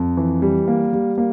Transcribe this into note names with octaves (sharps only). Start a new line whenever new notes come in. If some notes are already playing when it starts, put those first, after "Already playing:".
Already playing: F2
E3
G3
A#3
G3
A#3